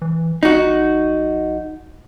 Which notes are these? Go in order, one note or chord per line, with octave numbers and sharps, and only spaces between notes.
E3
A#1 D#4 F#4